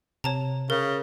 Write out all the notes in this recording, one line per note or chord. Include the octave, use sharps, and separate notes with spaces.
C3 C#5 A5 A#5
C#3 A#4